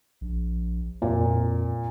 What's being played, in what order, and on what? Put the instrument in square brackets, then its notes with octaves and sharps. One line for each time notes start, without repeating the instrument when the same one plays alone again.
[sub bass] A#1
[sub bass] F2 [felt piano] A#2